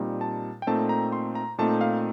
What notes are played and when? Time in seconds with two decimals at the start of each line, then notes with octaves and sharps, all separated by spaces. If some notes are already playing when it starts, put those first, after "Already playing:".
Already playing: A#2 G3 C4 D#4
0.21 A5
0.62 G5
0.67 A#2 A3 C4 D#4 A5
0.89 A#5
1.12 C6
1.35 A#5
1.58 A#2 A3 C4 D#4 A5
1.81 F5